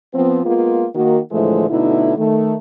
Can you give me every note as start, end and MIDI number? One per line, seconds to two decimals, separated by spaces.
0.13 0.40 53
0.13 0.40 59
0.13 0.40 60
0.45 0.85 56
0.45 0.85 58
0.45 0.85 59
0.45 0.85 65
0.95 1.18 51
0.95 1.18 58
0.95 1.18 66
1.31 1.67 45
1.31 1.67 50
1.31 1.67 52
1.31 1.67 53
1.31 1.67 56
1.31 1.67 57
1.69 2.12 47
1.69 2.12 50
1.69 2.12 57
1.69 2.12 63
1.69 2.12 64
2.17 2.54 51
2.17 2.54 57